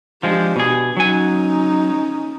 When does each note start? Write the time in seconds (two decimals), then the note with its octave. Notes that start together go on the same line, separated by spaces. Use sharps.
0.23 F3 G#3 D4 G4
0.56 B2 G#4
0.97 F#3 C#4 D#4 G#5